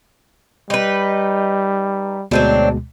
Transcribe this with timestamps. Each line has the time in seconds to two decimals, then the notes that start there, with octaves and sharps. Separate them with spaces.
0.70 G3 D#4 B4
2.31 D2 B2 F#3 G#3 C4 D4